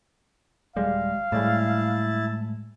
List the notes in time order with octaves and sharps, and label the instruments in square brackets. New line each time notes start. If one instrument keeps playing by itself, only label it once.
[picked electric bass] D#1 G3 G#3 [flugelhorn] F5
[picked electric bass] A2 G3 G#3 [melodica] E4 A5